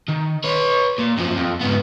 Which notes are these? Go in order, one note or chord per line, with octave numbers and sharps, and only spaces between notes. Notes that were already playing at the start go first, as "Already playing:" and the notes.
D#3
B4 C#5
A#2
F#2 F3
F2
G#2 B3